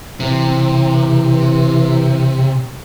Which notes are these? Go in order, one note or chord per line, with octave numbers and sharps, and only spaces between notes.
C3 E3